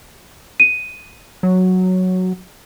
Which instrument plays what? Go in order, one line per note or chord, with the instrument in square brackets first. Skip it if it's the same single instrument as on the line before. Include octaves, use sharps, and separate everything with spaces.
[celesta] D#7
[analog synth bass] F#3